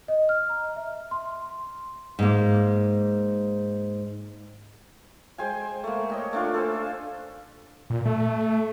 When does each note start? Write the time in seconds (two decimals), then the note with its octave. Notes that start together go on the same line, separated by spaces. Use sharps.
0.08 D#5
0.29 F6
0.49 A#5
0.76 E5
1.11 C6
2.19 G#2 A#3
5.38 G#3 C5 G5 G#5
5.84 A3 A#3
6.10 C#5 D#5 G5
6.33 A3 D4 F4
6.54 A4 C5 G#5
7.90 A#2
8.05 A3